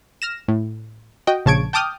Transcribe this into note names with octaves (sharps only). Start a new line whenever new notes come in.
F6 A#6 E7
A2
F#4 D#5 G5
A#1 C#3 A5 C#6 G#6 D7
G5 A5 D6 D#6 F6 G6